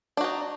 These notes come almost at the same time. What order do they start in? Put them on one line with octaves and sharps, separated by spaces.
D4 F#4 D#4